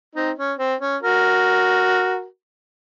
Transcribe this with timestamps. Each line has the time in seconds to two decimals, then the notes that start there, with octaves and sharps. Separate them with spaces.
0.15 C4 D#4
0.38 C#4
0.59 C4
0.81 C#4
1.03 F#4 A#4